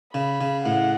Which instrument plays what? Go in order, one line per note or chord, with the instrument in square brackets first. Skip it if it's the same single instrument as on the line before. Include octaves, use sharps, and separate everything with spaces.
[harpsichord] C#3 [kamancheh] B5
[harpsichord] C#3
[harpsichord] A2 [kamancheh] F#5